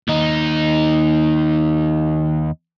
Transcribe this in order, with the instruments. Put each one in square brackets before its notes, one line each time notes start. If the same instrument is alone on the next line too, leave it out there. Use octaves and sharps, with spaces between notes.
[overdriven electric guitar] D#2 D#4